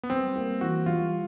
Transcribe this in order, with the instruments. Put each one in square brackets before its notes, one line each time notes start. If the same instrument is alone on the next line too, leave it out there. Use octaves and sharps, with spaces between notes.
[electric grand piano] B3
[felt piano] G3 [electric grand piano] C4
[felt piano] A#3
[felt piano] E3 [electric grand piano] F#4
[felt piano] G3 [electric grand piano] F4